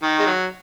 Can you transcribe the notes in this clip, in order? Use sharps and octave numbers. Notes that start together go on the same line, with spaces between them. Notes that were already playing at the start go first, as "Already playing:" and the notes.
D#3
G#3
F#3